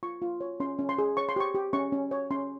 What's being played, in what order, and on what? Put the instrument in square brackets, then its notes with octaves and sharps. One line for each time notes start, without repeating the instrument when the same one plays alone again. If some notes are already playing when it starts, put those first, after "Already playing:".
[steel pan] F4 C#6
F4
C#5
C#4 C6
C#4
C6
G#4
C#5 C#6
C6
G4 C#6
G4
C#4 C#6
C#4
C#5
C#4 C6